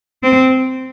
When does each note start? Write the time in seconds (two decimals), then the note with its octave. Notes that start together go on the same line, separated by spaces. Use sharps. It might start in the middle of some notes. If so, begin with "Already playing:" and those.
0.23 C4